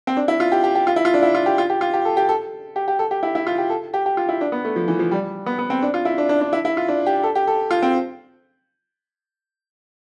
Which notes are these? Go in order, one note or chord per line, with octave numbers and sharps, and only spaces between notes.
C4
D4
E4
F4
G4
G4
G4
F4
E4
F4
D4
E4
F4
G4
F4
G4
F4
G4
A4
G4
A4
G4
G4
A4
G4
E4
E4
F4
G4
A4
G4
G4
F4
E4
D4
B3
A3
F3
E3
F3
G3
B3
B3
C4
D4
F4
E4
D4
D4
D4
E4
E4
F4
D4
G4
A4
G4
A4
F4
C4